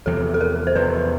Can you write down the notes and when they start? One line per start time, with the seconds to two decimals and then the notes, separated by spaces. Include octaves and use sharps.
0.06 E2 C3 F3 A4
0.34 A4
0.41 A#4
0.67 C5
0.75 E2 C3 F3 B4